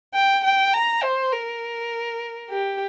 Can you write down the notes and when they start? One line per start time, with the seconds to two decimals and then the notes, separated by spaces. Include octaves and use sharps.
0.14 G5
0.44 G5
0.74 A#5
1.03 C5
1.32 A#4
2.50 G4